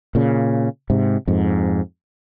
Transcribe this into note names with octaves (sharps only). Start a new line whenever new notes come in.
A#2 C#3
G#2 C3
F2 G#2